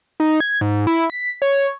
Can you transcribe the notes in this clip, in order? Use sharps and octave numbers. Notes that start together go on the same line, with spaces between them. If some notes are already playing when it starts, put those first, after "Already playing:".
D#4
G#6
G#2
E4
B6
C#5